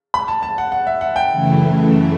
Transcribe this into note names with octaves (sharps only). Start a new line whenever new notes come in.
B5
A5
A5
F#5
F#5
E5
F#5
G5
F#2 C#3 E3 A3 E4